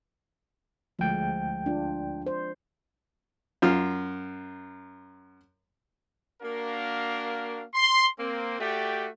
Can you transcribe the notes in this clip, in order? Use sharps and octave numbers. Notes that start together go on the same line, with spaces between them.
D2 F3 G#3 G5
D4 F4
C5
F#2 F4 F6
A#3 D4 F#4 A#4 F5
C6
A#3 C4
A3 F#4 G4 D5 G5